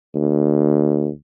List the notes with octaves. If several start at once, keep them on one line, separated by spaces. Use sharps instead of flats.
D2